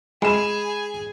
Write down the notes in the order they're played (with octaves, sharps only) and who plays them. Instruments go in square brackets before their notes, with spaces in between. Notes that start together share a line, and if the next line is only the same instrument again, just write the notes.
[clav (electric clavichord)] G#3 [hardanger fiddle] G#4 G#5 [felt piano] B5 E7